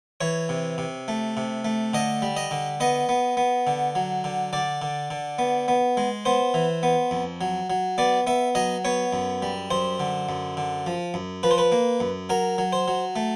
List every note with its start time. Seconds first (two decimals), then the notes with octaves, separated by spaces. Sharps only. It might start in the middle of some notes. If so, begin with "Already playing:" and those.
0.21 E3 C#5
0.49 C3
0.78 C3
1.08 A3
1.37 C3
1.65 A3
1.94 D3 D#5
2.22 G3
2.37 D#5
2.51 D3
2.80 B3 D#5
3.09 B3
3.37 B3
3.67 D3
3.95 F#3
4.24 D3
4.53 D3 D5
4.82 D3
5.11 D3
5.39 B3
5.68 B3
5.97 G#3
6.25 B3 C5
6.54 E3
6.83 B3
7.11 F2
7.41 F#3
7.70 F#3
7.98 B3 D5
8.27 B3 E5
8.55 F#3 D#5
8.85 B3 C#5
9.13 F#2
9.42 G3
9.71 F#2 C5
10.00 D3
10.29 F#2
10.57 D3
10.86 F3
11.14 F#2
11.43 F3 B4
11.51 C5
11.58 B4
11.72 A#3
12.00 F#2
12.30 F#3 A#4
12.58 F#3
12.73 C5
12.88 F#3
13.16 A3